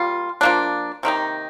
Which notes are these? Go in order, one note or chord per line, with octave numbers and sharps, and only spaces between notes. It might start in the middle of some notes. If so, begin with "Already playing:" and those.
Already playing: G3 A#3 F4
F3 A#3 D4
C3 D#3 A#3 D#4